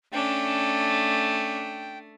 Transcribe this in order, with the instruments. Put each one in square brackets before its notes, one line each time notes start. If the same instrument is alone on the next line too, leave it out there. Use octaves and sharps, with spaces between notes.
[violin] A3 [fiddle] C#4 D4 [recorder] G5